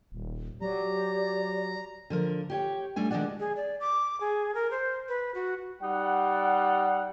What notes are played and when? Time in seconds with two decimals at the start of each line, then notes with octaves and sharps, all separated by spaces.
0.12 D#1
0.61 F#3 G4 D5 A#5
2.10 D3 F3 A#4
2.50 G4 C#5 G5
2.96 G3 A3 D4 G#5
3.11 D#3 G#3 B3 D4 D5 F#5
3.40 G#4
3.56 D5
3.80 D6
4.21 G#4
4.55 A#4
4.71 C5
5.09 B4
5.35 F#4
5.82 G3 D#4 F#5